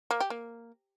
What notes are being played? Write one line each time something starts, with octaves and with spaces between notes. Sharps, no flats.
A#3
G4
A#3